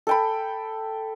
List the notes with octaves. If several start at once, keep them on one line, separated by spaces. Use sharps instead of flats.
A4 G5 B5